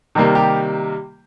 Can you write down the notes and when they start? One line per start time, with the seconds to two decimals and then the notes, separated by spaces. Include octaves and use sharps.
0.15 C3 D#3 G3 A#3
0.35 G4